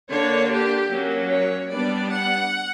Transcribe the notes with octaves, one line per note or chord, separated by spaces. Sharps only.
D3 A#3 D4 C#5
G4
F#3 A#3 C#4
C#5
G3 B3 D4 D5
F#5